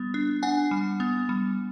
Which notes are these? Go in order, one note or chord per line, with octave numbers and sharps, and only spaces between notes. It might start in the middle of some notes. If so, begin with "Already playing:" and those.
Already playing: G3 B3
D4
D4 F#5 G#5
G3
B3
G3